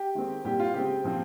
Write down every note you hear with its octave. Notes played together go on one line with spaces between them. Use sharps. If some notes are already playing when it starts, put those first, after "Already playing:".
Already playing: G4
D#3 G#3 C4
A#2 G3 C4 G4
F4
C#3 G#3 C4 G4
A#2 F3 C4